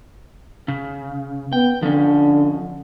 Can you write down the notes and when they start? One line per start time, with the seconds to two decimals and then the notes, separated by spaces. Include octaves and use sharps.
0.68 C#3
1.53 B3 G5
1.83 D3 F3 C#4